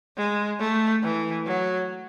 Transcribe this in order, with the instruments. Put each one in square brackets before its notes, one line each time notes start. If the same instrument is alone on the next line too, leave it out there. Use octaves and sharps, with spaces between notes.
[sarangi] G#3
A3
E3
F#3